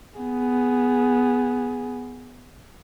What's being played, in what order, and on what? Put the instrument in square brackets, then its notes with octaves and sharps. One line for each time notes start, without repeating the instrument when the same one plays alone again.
[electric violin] B3 G#4